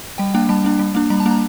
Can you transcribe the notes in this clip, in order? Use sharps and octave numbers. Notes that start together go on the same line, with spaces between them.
G3 G5
A#3 D4 G5
G3 A5
A#3 D4
G3
A#3 D4
G3 A#5
A5
A#3 D4
A#5